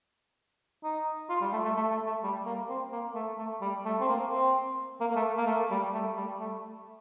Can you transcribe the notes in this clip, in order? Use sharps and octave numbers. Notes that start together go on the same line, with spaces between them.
D#4
F4
G3
A3
A3
A3
A3
A3
G3
A#3
C4
A#3
A3
A3
G3
A3
C4
A#3
C4
A#3
A#3
A3
A#3
A3
G3
A3
G3
A3